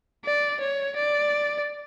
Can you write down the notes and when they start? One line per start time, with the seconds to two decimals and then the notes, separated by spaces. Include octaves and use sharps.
0.25 D5
0.60 C#5
0.96 D5